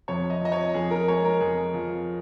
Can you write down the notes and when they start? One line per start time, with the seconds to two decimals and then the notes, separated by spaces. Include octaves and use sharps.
0.08 F2 C#5
0.30 D#5
0.41 F3 D#5
0.52 C#5
0.74 F2 G#4
0.91 A#4
1.08 G#3 C#5
1.24 A#4
1.41 F2 G#4
1.74 F3